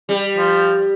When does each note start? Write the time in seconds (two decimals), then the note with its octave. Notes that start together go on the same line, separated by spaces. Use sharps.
0.09 G3
0.37 F3